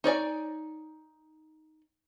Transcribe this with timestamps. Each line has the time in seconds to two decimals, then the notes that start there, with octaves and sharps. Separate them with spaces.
0.04 D#4 C#5 D5 G#5